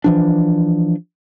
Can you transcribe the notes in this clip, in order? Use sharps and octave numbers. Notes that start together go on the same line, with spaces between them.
E3 F3 D4